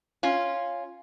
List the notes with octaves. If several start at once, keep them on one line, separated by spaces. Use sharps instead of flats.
C#4 F4